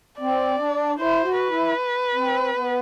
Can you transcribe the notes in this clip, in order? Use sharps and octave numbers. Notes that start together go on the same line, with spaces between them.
C4 D5
D4
E4 C5
F#4
B4
E4
C4
B3